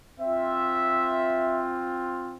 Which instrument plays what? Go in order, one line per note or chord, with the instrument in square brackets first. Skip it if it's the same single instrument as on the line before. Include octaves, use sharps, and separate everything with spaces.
[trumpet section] C4 F4 E5